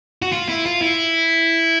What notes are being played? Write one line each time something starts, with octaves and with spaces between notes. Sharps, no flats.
F#4
F4
E4
F4
E4